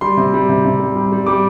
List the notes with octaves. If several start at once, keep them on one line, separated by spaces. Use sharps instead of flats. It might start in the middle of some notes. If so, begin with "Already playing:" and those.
G3 C6
C3
G3
C3
C3
G3
G3
G3
G3 D6